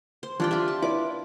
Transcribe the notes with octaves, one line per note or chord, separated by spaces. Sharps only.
C5
E3 D4 F4 G4 D5 G5
F4 G4 E5
A5
E4 B4 D5 D6